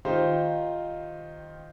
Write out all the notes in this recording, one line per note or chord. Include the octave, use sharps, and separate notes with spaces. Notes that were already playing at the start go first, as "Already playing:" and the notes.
D#3 D#4 F4 G4 C5